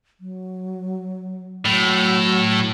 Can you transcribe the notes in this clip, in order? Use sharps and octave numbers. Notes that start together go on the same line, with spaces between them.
F#3
A2 F#3